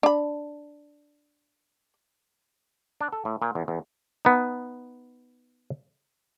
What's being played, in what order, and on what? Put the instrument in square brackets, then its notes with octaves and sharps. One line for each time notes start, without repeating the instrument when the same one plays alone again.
[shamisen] D4 B5
[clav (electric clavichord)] D4
A4
A2
A#2
E2
E2
B3 D#4